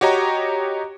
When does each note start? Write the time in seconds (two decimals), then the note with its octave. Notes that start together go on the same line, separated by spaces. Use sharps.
0.01 F#4 G4 C#5 D#5 A#5